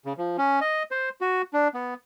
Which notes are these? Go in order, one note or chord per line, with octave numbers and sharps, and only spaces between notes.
C#3
F3
C#4
D#5
C5
F#4
D4
B3